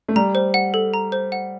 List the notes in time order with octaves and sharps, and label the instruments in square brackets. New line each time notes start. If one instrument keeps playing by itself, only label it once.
[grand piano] A3
[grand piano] G3 [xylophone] A#5
[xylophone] C5
F#5
A4
A#5
C5
F#5